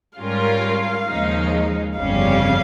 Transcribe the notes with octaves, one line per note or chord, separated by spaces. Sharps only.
G#2 G3 C#4 F4 A#4 F5
D#2 C#3 F3 G#3 D#4
G1 F2 C#3 G3 C#4 F5